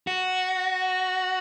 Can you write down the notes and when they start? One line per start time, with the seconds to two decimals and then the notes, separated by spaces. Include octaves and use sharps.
0.07 F#4